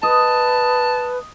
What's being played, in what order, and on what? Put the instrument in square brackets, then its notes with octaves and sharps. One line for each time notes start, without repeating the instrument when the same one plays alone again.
[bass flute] B4 [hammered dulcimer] D#5 [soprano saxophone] A5